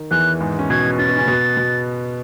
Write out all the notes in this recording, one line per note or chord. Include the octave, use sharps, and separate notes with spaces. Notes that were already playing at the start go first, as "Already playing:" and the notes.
Already playing: D#3
E2 E3 F#6
G#2 G#3
C#4
B2 B3 G#6
C#4 A6
B3
C#3 C#4
B2 B3
B2 B3